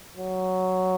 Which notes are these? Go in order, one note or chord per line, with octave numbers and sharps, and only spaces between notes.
F#3